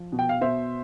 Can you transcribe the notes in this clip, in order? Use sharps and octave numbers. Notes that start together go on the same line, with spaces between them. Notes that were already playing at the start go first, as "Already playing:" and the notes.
Already playing: F3
B2
G5
F5
B2 C5 E5